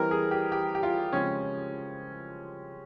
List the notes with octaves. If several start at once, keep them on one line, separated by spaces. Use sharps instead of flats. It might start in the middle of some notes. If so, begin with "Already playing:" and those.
Already playing: E3 G3 C4 A#4
G#4
G4
G4
G4
F4
C#3 F3 G#3 C4 C#4